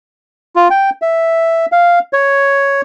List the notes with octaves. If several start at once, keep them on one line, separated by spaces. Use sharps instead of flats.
F4
G5
E5
F5
C#5